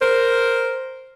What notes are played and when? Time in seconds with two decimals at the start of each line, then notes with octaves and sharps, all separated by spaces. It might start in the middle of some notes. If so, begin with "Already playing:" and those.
0.01 A#4 C5